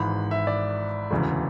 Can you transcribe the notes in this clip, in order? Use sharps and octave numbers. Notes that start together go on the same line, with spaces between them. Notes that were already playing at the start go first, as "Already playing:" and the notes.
Already playing: G#1 G#2 E3 B5
E5
D5
E1 D2 C#3 E3